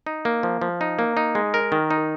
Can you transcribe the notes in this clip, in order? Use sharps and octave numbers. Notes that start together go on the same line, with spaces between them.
D#4
A#3
F3
F3
D#4
A#3
D#4
G#3
A#4
D#3
D#4